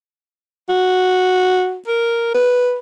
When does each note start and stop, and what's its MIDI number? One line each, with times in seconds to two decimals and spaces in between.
0.69 1.78 66
1.87 2.31 70
2.34 2.78 71